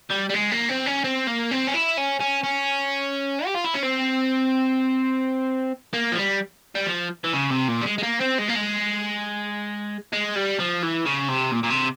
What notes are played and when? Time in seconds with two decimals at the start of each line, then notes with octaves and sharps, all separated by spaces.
0.11 G3
0.30 G3
0.34 G#3
0.52 A#3
0.69 C4
0.86 C#4
1.04 C4
1.27 A#3
1.51 C4
1.67 C#4
1.74 E4
1.97 C#4
2.20 C#4
2.44 C#4
3.46 G4
3.55 F4
3.65 E4
3.74 C#4
3.83 C4
5.93 A#3
6.12 F3
6.17 G3
6.75 G3
6.87 F3
7.24 E3
7.33 C#3
7.51 C3
7.68 A#2
7.81 G3
7.86 G#3
7.98 G#3
8.03 A#3
8.21 C4
8.39 G#3
8.49 A#3
8.55 G#3
10.13 G#3
10.36 G3
10.60 F3
10.83 E3
11.06 C#3
11.29 C3
11.53 A#2
11.63 A#2
11.70 C3